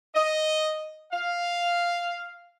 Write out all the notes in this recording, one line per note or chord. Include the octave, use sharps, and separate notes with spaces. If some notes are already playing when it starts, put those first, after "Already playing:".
D#5
F5